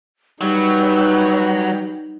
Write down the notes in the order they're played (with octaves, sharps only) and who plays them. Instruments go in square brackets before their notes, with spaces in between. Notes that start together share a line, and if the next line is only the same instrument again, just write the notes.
[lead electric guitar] F#3 [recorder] G3 [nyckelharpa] D#4 B4